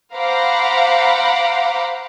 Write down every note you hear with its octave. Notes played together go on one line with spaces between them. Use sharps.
C5 F5 F#5 A#5 B5 D6